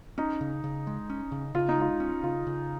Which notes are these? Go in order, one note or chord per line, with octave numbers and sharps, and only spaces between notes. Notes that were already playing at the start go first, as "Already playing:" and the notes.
C#4 D#4
C#3
C#3
G#3
C#4
C#3
C#3 F4
D#4
G#3 F4
C#4
C#3 F4
C#3